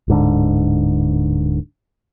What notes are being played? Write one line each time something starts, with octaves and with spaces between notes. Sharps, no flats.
D1 G#2 D3